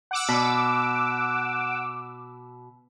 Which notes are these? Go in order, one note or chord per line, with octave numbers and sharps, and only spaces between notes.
F#5 D6 E6
B2